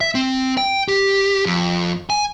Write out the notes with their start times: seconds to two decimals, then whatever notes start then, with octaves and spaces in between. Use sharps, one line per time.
0.01 E5
0.15 C4
0.57 G5
0.88 G4
1.45 F2
2.10 G#5